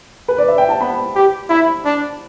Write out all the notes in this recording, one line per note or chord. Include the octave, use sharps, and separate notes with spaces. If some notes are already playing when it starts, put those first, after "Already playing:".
B4
D5
E5
G5
A5
B3 B5
G4
E4 B5
D4